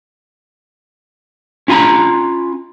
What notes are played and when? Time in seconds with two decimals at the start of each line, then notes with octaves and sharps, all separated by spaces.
1.68 C#4 F4 G#5 A#5 B5